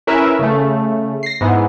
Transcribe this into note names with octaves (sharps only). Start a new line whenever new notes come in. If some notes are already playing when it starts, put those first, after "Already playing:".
C#4 E4 A#4 B4 E5
C#3 A3
A#6 C7
G#2 B3 E4